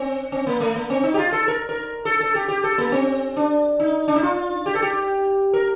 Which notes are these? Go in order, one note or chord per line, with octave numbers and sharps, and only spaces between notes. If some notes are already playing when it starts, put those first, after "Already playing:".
Already playing: C4
C4
A#3
A3
A#3
C4
D#4
G4
F4
A4
A#4
A#4
A4
A4
G4
G4
A4
A#3
C4
D4
D#4
D4
D#4
F4
G4
A4
G4
A#4